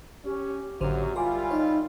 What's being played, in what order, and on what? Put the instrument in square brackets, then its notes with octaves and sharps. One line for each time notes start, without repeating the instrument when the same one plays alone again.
[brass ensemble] C#4 [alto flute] G4
[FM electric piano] A1 D3 C5 [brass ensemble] F#2 A#2 F#3
[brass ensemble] G3 E4 F4 [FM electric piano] A#4 C6 D6 [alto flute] G#5
[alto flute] D#4 [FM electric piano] C#5 E5 F5